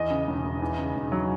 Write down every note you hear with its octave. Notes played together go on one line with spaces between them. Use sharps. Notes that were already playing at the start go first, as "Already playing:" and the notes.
Already playing: E2 D#5
C#3
E1
E1
E2
C#3
E1
F#3